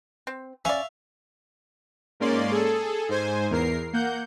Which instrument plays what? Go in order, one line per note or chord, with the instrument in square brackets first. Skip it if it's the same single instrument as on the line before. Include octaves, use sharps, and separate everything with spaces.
[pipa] C4
[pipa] C#4 D5 [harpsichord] E5 F5
[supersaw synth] G#2 A#3 C#4 D5 C6
G#4 A4
G#2 C5 G#5
E2 A#4 C7
A#3 F#5 G6